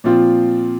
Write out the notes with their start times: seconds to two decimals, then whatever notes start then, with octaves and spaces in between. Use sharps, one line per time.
0.04 A#2 F3 C4 F4